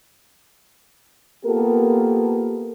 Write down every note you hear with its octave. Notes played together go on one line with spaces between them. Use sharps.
A#3 B3 F4 G4 A4 A#4